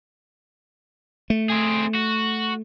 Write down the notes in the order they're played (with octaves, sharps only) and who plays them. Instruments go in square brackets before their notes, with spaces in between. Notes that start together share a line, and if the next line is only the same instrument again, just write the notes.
[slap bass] A3
[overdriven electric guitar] C4 G#4
F#4